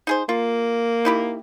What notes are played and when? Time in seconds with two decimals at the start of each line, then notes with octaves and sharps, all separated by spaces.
0.07 D#4 G#4 C5
0.29 A#3 F4
1.05 D#4 E4 G4